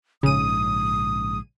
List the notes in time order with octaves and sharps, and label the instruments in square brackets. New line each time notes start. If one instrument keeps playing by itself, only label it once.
[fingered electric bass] A#1 G#2 [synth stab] C#3 D#7 [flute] D#6